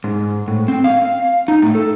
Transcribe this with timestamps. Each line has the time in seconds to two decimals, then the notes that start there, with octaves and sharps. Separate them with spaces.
0.04 G#2
0.48 A2
0.68 C4
0.84 F5
1.48 D#4
1.62 A2
1.75 A4